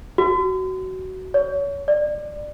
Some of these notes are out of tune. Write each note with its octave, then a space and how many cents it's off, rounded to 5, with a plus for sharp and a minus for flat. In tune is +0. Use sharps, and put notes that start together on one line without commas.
F#4 +20
C#5 +30
D5 +25